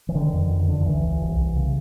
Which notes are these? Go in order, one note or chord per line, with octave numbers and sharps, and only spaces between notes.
E3
D3 D#3
F2
F#2
D3
D#3
C#2 E3
C#2
C2
C2
C#3